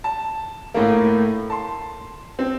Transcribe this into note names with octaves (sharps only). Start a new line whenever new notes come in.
A5
A2 A3 A#3
A5 C6
C4